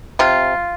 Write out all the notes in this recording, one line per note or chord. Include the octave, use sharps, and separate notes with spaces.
C3 F4